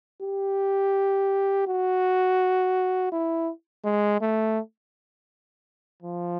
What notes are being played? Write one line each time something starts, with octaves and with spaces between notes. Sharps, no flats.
G4
F#4
E4
G#3
A3
F3